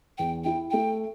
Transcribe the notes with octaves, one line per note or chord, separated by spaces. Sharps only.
E2 G5
E4 G5
A3 G5